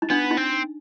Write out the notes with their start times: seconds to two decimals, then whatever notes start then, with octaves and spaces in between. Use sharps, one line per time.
0.02 D#4
0.10 B3 D4
0.31 D#4
0.37 C4